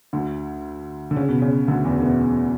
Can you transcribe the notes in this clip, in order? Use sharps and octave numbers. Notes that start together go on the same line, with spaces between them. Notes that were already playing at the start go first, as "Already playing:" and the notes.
D2 D3
D3
C#3
B2
C#3
D2 D3
E2 E3
B2 B3